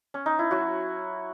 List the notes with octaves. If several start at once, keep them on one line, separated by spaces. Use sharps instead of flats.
C#4
D#4
E4
F#3 F#4